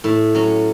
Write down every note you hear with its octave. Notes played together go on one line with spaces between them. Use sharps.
A2
F#3 C#4